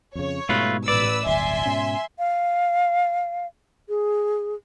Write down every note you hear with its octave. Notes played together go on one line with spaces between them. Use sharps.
F2 C#3 C#5
G#2 B2 G3 A3 F4 B4
A1 B4 D5 E6
D1 G1 E5 G#5 C6
G#2 B2 C#4
F5
G#4